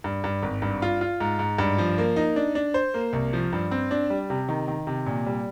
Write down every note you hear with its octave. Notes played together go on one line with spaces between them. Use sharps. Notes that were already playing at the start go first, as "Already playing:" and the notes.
G2
G2
G#1
G2
F4
F4
G#2
G#2
G2
F3
A#3
D#4
D4
D4
C5
A#3
C2
F3
G2
C4
D4
G3
C3
D#3
D#3
C3
A#2
G3